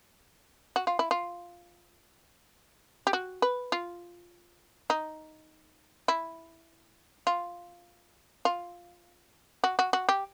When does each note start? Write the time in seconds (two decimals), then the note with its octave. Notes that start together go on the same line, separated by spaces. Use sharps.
0.76 F#4
0.87 F4
0.99 E4
1.11 F4
3.07 G4
3.13 F#4
3.42 B4
3.72 F4
4.90 D#4
6.08 E4
7.27 F4
8.45 F4
9.64 F#4
9.79 F#4
9.93 F#4
10.09 G4